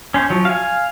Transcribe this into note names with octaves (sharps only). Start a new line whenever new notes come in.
C#4 C5
F3 F#3
F5 G#5